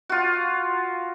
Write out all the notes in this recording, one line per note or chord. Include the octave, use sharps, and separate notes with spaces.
F4 F#4